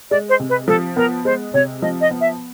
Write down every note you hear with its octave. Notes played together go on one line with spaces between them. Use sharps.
G#3 D5
C5
C3
B4
F3 A4
B3 A#4
G#3 C5
C3 C#5
F3 D#5
D#5
B3
E5